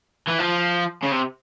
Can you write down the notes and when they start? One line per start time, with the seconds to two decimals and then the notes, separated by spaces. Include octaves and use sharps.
0.28 E3
0.40 F3
1.03 C#3
1.11 C3